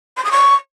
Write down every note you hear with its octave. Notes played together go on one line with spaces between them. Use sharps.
C6
D#6
C#6